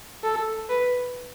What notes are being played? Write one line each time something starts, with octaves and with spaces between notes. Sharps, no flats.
A4
B4